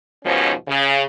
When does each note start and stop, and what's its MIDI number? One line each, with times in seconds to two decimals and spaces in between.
0.25 0.52 39
0.25 0.52 44
0.25 0.52 47
0.25 0.52 53
0.25 0.52 61
0.68 1.02 49